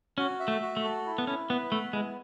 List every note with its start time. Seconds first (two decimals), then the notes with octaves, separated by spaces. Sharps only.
0.18 C#4 F#4
0.40 E5
0.48 A3
0.62 F#4
0.77 A3
0.84 A4
1.06 E4
1.18 B3
1.27 C#4 E4
1.50 B3 B4
1.72 A3 B3
1.93 G#3 E4